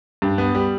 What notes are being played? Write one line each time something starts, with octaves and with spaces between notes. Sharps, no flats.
G2
B3
G3